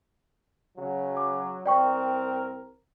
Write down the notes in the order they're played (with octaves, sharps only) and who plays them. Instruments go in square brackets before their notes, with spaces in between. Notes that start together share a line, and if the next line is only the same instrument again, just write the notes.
[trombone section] C#3 F#3
[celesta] D6
[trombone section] C2 C4 A#4 [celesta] D5 G5 C#6